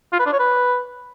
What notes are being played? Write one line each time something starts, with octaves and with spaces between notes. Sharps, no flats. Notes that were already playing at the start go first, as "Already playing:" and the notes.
F4
B4
D4
C#5
B4